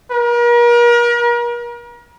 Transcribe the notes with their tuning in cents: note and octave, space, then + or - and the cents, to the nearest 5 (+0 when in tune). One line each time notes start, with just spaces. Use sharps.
A#4 +40